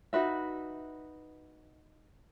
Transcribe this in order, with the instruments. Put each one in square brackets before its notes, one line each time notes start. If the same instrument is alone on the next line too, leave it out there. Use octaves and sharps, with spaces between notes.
[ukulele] D#4 F#4 B4 E5